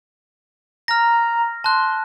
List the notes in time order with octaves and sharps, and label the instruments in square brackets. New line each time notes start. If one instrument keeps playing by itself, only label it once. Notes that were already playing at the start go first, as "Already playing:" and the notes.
[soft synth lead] A#5 [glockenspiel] F6 A#6
[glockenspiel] A5 F#6 [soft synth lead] C6